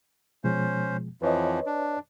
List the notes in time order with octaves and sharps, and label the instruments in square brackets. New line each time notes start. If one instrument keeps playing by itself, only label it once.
[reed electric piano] B2 F3 G#3 [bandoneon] C#4 C5
[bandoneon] F2 E3 F3 [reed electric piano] B4 C#5 D#5
[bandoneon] D4